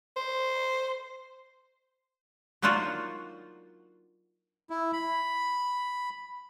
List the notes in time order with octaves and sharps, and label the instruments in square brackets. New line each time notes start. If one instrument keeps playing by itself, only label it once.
[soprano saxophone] C5
[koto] F#3 A#3 D4 D#4 F4 F#4
[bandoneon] E4
B5